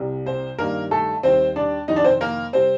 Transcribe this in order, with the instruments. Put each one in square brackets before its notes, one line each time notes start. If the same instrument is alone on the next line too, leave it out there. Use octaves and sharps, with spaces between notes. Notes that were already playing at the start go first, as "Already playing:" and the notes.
Already playing: [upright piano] C2 C3 G3
C4 C5
G2 D#3 G3 A#3 A#4
A3 A4
D#2 D#3 G3 C4 C5
D4 D5
F2 C3 D#3 D#4 D#5
D4 D5
C4 C5
A#3 A#4
C3 G3 C4 C5